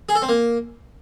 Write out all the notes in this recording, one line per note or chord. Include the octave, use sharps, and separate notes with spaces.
G#4
A4
C4
A#3